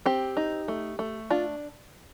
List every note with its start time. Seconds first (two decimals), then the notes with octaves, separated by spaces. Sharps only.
0.06 C4 G4
0.37 D#4
0.68 A3
0.99 A3
1.31 D4 F4